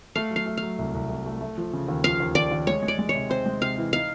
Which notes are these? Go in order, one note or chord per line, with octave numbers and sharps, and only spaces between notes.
A3 F5
F#3
F5
A3
F5
F#3
C2
C2
C2
A3
A3
F3
C#3
D#2
F3 F5
D#2
D#2 D5
D#2
G#3 C#5
G#3
D5
G#3
C#5
C3
C4 C5
G#3
C3 F5
E3
D#4 F5